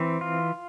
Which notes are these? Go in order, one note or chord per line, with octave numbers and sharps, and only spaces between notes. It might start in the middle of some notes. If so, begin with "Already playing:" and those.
Already playing: E3 C4
F4